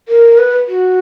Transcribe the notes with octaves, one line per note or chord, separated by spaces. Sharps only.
A#4
B4
F#4